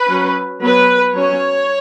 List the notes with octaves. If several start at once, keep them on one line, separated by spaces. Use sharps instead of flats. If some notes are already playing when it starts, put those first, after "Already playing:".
Already playing: B4
F#3 C#4
F#3 B3 B4
F#3 C#4 C#5